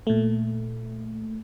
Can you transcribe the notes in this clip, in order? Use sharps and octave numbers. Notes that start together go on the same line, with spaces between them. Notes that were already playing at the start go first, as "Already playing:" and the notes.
A#2 A3